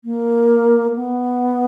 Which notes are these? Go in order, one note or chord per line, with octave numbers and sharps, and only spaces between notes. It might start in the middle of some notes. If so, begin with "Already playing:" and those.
A#3
B3